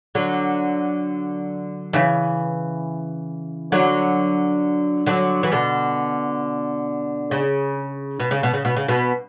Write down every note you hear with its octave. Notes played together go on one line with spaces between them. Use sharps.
D3 F#3
C#3 E3
D3 F#3
D3 F#3
E3
B2 D3
C#3
B2
C#3
B2
C#3
B2
C#3
B2